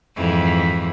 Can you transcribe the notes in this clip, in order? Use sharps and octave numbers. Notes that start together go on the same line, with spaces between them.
F2 G#2 E3